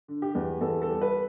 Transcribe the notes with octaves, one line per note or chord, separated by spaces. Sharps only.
D3
G4
E2
E2 A4
A4
G3
B4